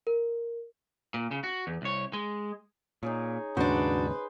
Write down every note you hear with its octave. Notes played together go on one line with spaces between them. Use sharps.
A#4
A#2
C#3
F#4
E2
C2 C#5
G#3
A#2 D#4 G#4 C#5
D#2 G#2 C#3 D4 F#4 B4 C5